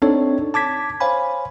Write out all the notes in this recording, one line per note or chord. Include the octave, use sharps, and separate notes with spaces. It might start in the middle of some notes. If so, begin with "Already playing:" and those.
C4 D4 D#4 A4 C#5
A5 D6 G#6 B6
C5 C#5 F5 G#5 B5